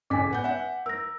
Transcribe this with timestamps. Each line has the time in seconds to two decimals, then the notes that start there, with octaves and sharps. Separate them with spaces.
0.10 A1 C#3 G#5 D6 B6
0.31 B3 F#5 G6
0.44 E5 F#5
0.86 A#4 E6 A#6